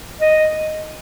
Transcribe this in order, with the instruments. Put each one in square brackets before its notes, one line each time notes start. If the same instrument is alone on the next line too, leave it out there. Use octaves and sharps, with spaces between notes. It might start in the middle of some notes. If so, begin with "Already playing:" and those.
[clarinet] D#5